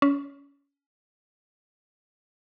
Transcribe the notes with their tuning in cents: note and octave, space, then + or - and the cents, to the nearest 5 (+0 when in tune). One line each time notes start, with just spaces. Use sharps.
C#4 +25